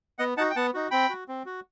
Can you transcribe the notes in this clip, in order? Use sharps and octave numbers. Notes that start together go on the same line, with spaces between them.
B3 D#5 F#5
D#4 F#4 F#5 A5
G5
B3 F#5 A5
D#4 F#4
C4 G5 B5
F#4
C4
F#4